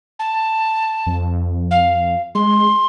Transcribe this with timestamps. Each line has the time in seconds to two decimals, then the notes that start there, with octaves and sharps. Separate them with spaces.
0.19 A5
1.06 F2
1.71 F5
2.35 G#3 C6